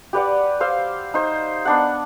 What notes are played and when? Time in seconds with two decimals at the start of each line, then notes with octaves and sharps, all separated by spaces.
0.13 G4 B4 D5 F#5
0.60 C5 F5 E6
1.14 D#4 C5
1.65 B3 D4 F#5